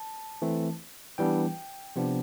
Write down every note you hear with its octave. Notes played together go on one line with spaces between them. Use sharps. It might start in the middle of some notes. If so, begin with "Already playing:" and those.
Already playing: A5
E3 A3 C4
E3 G3 B3 D4 G5
C3 F3 B3 D4